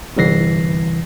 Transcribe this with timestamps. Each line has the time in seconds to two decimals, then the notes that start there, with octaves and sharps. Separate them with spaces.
0.16 G1 C2 E3 A#6 C7